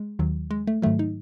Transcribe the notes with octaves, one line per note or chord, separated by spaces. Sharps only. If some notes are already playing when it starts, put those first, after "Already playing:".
Already playing: G#3
D#2 D#3 F#3
G#3
A3
G#2 D#3 F#3 A3
D#4